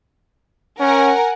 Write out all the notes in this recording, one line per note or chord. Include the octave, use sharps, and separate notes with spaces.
C#4 A#4 F#5 G#5